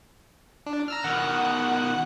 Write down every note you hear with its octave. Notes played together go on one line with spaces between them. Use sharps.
D4
A#5 E6 F6
B2 D#3 F#5